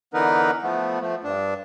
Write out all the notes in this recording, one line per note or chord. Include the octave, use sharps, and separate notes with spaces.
D3 E3 B3 D#4 A#4 B4
F3 A3 B3
F3 A3
G2 D4